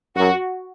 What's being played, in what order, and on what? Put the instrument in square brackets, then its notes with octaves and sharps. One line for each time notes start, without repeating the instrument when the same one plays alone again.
[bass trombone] F#2 [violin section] F#4